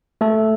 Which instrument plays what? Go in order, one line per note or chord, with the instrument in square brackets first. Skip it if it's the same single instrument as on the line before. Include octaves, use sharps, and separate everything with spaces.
[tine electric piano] A3 A4